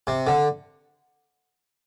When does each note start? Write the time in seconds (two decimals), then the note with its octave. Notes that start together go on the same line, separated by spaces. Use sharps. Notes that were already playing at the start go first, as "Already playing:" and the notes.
0.07 C3
0.27 D3